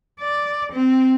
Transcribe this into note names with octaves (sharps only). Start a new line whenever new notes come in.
D5
C4